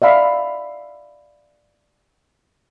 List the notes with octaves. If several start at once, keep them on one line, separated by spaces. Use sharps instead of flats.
D5 E5 F5 B5